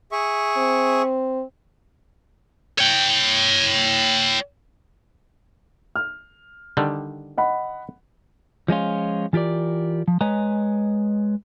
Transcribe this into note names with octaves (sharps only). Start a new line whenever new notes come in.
G#4 E5 C#6
C4
C#5 G5
F6
D3 D#3 G3
D#5 F#5 B5
F3 G#3 C#4 F4
E3 F4 G4 A#4 D5
F3
G#3 B4 C#5 D#5 G#5 A#5